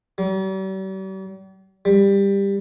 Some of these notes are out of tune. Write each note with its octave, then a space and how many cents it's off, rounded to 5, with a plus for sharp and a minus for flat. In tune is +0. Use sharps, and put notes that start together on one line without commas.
G3 -45
G3 +15